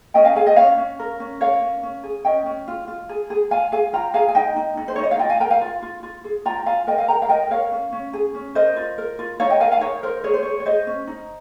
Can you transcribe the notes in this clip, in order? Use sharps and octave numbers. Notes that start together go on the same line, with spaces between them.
C#4 D#5 G5
F5 G#5
G#4 F5 G#5
D#5 G5
C#4 C#5 F5
C#4
A#4
C#4
A#4 C#5 F5
C#4
C#4
G#4
C#4 D#5 G5
C#4
F4
F4
G#4
G#4
F4 F5 G#5
G#4 F5 G#5
F4 G5 A#5
G#4 F5 G#5
G#5
D#4 D#5 G5
D#4
D#4
C5
C#5
D#4 D#5
F5
F4 D#5 G5
F5 G#5
A#4 G5 A#5
F5 G#5
F4
F4
F4
G#4
F4 G5 A#5
F4 F5 G#5
A#4 D#5 G5
F5 G#5
A#4 G5 A#5
F5
A#4 D#5 G5
A#4 C#5 F5
C#4
C#4
G#4
C#4
A#4 C5 D#5
F4
A#4
F4
D#4 C#5 F5
D#5 G5
A#4 F5 G#5
F5 G#5
D#4 C#5
A#4 C5
G#4 C#5
C5
G#4 C#5
C#5
G#4 C5 D#5
C#4
D#4